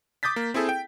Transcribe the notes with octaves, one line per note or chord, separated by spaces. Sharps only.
D6 D#6 G6 A6 B6
A#3
C4 E4 G#4 A4
G5